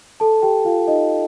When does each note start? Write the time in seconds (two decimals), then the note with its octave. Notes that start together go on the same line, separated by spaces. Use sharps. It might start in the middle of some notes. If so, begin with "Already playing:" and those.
0.20 A4 A5
0.42 G4 G5
0.65 F4 F5
0.87 D#4 D#5